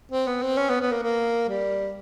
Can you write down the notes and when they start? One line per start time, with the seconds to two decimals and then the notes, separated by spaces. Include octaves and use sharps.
0.11 C4
0.27 B3
0.42 C4
0.57 C#4
0.69 B3
0.81 B3
0.92 A#3
1.03 A#3
1.49 G3